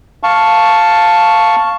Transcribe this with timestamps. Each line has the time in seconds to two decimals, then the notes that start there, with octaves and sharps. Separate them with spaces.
0.23 F5 A5 C#6